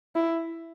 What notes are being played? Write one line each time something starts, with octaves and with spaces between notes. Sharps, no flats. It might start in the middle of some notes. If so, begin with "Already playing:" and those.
E4